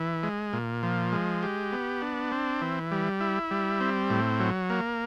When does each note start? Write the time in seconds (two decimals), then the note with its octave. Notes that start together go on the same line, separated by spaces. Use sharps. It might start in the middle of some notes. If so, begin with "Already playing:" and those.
Already playing: E3
0.23 G#3
0.53 A#2
0.83 F3
1.12 G#3
1.43 G4
1.72 B3
2.02 D4
2.32 C4
2.61 E3
2.91 G3
3.21 E4
3.51 G3
3.80 C4
4.10 A2
4.40 F#3
4.70 A#3